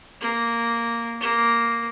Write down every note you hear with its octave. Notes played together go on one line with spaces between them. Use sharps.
A#3
A#3